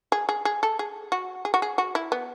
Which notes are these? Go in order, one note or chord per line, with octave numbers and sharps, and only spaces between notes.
G#4
G#4
G#4
A4
G#4
F#4
G#4
F#4
G#4
F#4
E4
B3